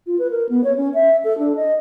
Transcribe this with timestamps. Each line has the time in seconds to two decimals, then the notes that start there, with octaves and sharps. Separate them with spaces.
0.07 F4
0.19 B4
0.31 A#4
0.49 B3
0.64 C#5
0.77 C#4
0.94 E5
1.24 A4
1.38 D4
1.56 D#5